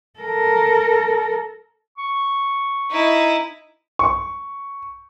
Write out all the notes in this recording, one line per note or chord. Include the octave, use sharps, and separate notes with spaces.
A4 A#4
C#6
D#4 E4
C#6